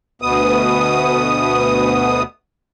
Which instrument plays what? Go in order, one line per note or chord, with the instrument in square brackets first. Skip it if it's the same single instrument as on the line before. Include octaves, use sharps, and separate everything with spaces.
[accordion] D2 B2 B3 D#6